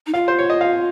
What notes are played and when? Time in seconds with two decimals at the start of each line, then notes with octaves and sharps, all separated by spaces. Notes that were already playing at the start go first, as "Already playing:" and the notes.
0.07 D#4
0.14 F4 F5
0.28 C5
0.39 C#5
0.50 D#5
0.61 F5